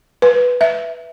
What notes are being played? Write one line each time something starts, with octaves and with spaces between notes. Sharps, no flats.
B4
E5